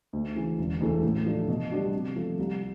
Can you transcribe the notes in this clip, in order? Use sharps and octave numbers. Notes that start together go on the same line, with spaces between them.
D2
C#3 E3
E1
D2 C#3 E3 A3
A2
F3 A3 D4
B2
G3 B3 D4 F#4
C3
F3 A3
C2